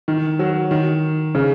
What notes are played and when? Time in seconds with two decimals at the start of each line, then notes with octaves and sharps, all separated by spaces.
0.08 D#3
0.39 F#3
0.71 D#3
1.35 C#3